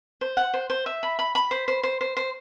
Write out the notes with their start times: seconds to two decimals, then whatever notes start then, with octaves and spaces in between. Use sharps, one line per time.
0.21 C5
0.37 F#5
0.54 C5
0.70 C5
0.86 E5
1.03 B5
1.19 B5
1.35 B5
1.51 C5
1.68 C5
1.83 C5
2.01 C5
2.17 C5